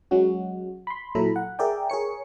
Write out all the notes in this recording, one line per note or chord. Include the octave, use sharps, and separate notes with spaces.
F#3 G#3 C#4 F#4
B5 C6
A#2 F#3 E4 A4 A#5 B5
F#5
G#4 A#4 D5 E5 G5
G#4 A#4 C#5 C#7